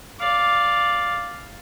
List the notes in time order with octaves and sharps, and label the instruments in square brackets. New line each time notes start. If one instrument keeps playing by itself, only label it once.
[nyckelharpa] D5 F5